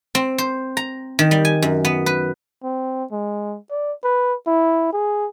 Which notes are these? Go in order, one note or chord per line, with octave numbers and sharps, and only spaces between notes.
C4
C5
A#5
D#3
G3
G#5
F#2
B3
B4
C4
G#3
D5
B4
E4
G#4